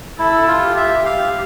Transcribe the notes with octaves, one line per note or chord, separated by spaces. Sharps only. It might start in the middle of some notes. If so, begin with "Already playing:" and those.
E4 A4
F4
G4
E5
G4 F5